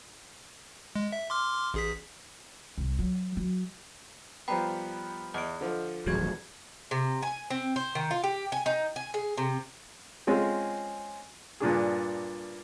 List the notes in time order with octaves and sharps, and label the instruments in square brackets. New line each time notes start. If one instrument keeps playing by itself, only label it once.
[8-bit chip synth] G#3
E5
C6 D6 F6
A1 G#4 B6
[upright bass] C2 G3
F#3
F#3
[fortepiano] F3 G3 B3 [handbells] G5 A#5
[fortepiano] E2 [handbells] D#5 D7
[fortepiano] D3 F3
[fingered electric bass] D#1 A1 F#3 [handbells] F#4 G#4 G#6
[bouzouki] C3
G#5
C4
C5
D#3
F4
G4
G#5
D#4
G#5
G#4
C3
[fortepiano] G#3 C4 C#4 F4
G2 A#2 D4 G#4